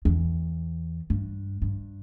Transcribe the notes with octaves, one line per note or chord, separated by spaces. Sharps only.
E2
G2
G2